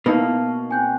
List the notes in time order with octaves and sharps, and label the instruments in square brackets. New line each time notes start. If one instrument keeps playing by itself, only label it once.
[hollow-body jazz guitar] B2 A#3 [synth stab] B3 D#4 E4 [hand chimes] F5 A5 F6
[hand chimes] C4 G5 F#6 [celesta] G#5 G6